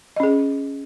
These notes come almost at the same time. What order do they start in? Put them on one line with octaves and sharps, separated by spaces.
D#5 C#4 G#4